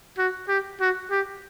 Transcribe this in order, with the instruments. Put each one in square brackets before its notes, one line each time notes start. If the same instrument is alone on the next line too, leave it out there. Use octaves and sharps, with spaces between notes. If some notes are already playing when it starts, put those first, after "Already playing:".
[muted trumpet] F#4
G4
F#4
G4